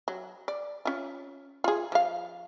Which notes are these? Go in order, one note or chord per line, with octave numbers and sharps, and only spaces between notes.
F#3
D5
C#4 F4
F4 G#4
F3 F5